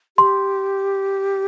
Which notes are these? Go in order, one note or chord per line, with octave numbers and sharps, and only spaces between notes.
G4 C6